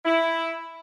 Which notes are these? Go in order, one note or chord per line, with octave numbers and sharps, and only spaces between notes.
E4